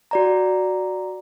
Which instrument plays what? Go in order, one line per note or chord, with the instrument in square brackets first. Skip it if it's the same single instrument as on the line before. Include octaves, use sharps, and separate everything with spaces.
[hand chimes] F#4 D5 A#5